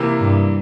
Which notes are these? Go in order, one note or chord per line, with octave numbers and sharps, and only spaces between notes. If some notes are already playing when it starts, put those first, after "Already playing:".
Already playing: C3 E3 A#3
G2